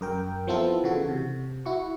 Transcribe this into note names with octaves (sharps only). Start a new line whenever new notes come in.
F#2 A#4 G5
F3 B3 C4 E4 F4 A4
C#3 E3 F#4 A4
C3
E4 F#4 C#6